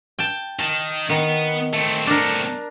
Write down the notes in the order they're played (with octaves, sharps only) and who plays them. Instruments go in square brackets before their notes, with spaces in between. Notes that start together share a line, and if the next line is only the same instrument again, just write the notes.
[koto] G5 A5
[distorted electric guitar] D#3 [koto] A5
[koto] D#3 [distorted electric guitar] B3
[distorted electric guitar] A3 C4
[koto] D4 A#4